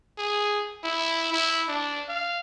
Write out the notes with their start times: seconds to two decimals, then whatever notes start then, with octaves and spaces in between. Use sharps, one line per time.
0.18 G#4
0.84 E4
1.32 E4
1.68 D4
2.09 F5